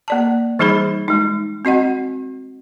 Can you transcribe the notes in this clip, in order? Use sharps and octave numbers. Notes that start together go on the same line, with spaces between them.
A#3 D5 A5
E3 G3 D#4 G#4 C5 B5
G#3 D#4
C4 F#4 D#5 F#5